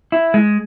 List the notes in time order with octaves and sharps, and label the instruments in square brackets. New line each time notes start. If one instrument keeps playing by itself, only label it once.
[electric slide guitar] E4
G#3